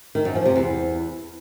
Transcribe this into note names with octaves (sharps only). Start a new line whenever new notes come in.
D#3
F#2
F3
C3
E2